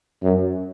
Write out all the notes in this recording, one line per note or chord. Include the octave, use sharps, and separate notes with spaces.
F#2